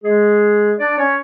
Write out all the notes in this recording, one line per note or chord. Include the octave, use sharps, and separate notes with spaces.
G#3 G#4
D4 D5
C#4 C#5